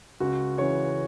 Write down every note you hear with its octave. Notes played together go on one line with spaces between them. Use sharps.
C#2 F#4
C#3 E3 C#5